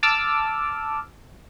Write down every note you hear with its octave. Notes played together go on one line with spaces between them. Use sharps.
A5 D6 E6 F6